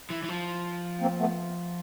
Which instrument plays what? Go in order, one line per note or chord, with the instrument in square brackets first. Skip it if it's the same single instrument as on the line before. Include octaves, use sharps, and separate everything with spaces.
[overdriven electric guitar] E3
E3
F3
[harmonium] A#3 C4
A3 B3